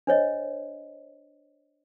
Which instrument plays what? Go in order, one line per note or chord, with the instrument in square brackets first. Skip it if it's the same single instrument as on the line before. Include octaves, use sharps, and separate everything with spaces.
[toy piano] D4 C5 C#5 D#5